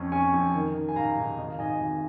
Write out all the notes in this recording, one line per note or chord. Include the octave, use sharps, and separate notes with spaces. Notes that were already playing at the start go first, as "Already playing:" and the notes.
Already playing: F2 C#4 C#6
C#4 G#5 C#6
F2
D#3
D#3
G#5
G#2 F5 A#5
G#2
G#1 D#5
F5
G#2 D#5 G#5
D#5 G#5
G#1